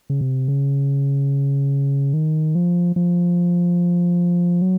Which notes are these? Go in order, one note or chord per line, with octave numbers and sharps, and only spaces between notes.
C#3
C3
C#3
D#3
F3
F3
F#3